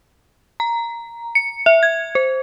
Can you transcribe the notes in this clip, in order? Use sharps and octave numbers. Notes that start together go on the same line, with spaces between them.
A#5
C#7
E5
G#6
C5